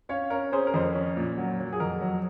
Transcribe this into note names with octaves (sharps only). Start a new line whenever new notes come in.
C#4 C#5 F5
C#4 A#4 C#5
C#4 G#4 C5
A#4
F2 C5
A#4
C#4
A#2
F#3
F#3
G#4
F2 A#4
F#3